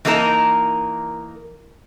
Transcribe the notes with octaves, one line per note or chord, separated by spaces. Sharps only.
E3 A#3 D#4 A#4 A5